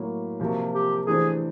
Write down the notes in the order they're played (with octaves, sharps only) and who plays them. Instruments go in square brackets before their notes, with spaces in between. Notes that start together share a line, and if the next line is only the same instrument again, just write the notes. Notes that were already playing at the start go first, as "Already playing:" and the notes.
Already playing: [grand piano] A2 F#3 A#3
[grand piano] C3 F3 A#3 [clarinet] F#4
[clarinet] G4
[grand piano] E3 A3 D4 G4 C5 [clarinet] G#4